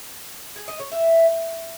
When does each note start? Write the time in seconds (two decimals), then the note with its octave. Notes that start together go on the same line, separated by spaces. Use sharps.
0.56 G#4
0.68 D#5
0.80 C#5
0.92 E5